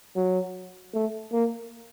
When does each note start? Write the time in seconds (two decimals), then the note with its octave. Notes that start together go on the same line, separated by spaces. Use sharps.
0.16 F#3
0.94 A3
1.33 A#3